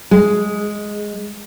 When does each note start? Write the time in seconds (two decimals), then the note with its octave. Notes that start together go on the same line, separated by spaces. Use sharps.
0.11 G#3